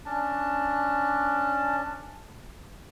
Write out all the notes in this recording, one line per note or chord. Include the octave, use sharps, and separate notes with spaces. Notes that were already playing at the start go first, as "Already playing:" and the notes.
C#4 D4 A5